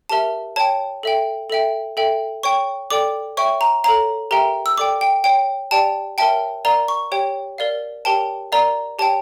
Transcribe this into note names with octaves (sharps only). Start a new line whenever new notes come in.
G4 A#4 E5 A5
C#5 G5 A5
A4 E5 G5
A4 E5 G5
A4 E5 G5
C#5 G5 C#6
A4 D5 G5 D6
C#5 E5 G5 C#6
A#5
A4 C#5 F5 A#5
G4 A#4 E5 G5 A#5
E6
A4 D5 G5 D6
G5
C#5 G5
G4 D5 G5 A5
A#4 C#5 E5 G5 A5
A#4 D5 F5 A#5
C#6
G4 C#5 G5
A#4 D5 F5
G4 A#4 C#5 G5 A5
A#4 D5 F5 A#5
G4 C#5 G5 A5